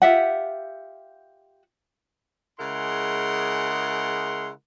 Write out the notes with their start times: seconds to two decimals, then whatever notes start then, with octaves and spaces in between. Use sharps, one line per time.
0.02 F4 G4 E5 F#5
2.60 C#3 G#3 E4 A#4 F#5 C6